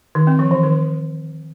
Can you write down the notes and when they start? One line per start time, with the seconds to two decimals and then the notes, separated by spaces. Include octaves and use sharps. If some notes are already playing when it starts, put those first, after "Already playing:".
0.15 D#3
0.27 C4
0.39 F3
0.51 E3
0.63 D#3